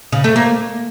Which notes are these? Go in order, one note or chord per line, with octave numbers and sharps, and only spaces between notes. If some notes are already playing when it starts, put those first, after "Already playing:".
C#3
A3
A#3